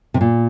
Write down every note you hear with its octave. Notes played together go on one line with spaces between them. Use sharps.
C3
A#2